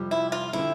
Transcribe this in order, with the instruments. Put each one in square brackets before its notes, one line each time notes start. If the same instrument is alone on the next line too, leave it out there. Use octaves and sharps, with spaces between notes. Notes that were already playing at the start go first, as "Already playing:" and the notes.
Already playing: [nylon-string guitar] F2 C3 G3
[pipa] E4
F4
[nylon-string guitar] D3 F3 C4 [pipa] E4